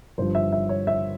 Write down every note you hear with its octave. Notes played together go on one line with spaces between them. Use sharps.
G1 G2 F3 C5
E5
E5
C#5
E5